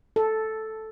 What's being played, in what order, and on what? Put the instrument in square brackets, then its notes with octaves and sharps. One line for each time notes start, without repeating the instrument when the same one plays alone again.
[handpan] A4